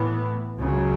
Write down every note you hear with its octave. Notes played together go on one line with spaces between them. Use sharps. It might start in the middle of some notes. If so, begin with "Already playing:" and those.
Already playing: A2 E3 B3
C#2 C#3 F#3